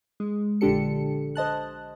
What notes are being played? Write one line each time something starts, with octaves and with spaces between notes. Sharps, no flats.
G#3
A#1 D3 D4 G4 A4 C#7
C5 D#5 A5 F#6